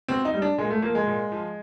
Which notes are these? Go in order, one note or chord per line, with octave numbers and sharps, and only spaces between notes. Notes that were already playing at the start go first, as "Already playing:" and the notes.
B2 C4
D#4
G3
D4
A#2 G#3
A3
F3 A#3
G#3
A#2
F3